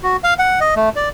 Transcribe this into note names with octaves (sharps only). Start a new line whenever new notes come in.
F#4
F5
F#5
D#5
A3
D5